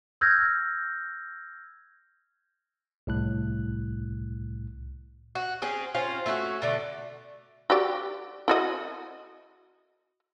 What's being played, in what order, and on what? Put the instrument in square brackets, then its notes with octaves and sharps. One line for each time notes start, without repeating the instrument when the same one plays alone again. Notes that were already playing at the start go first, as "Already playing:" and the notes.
[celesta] E6 F6 G6 G#6 A#6
[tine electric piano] C2 A2 F#6
[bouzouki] F#4
C4 C#4 G#4
C4 C#4 F4
A3 C#4 F4 F#4
B2 D3 A3
[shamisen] F#4 G4 D5
E4 F#4 D#5